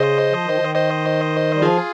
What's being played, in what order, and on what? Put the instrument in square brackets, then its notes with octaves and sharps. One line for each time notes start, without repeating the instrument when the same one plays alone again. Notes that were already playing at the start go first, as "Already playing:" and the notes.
Already playing: [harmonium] C#3 [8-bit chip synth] C5 D#5
[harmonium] F3
D#3
F3
D#3
[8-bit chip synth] C5 D#5
[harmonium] G3
[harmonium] F3 [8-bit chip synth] F4 G#4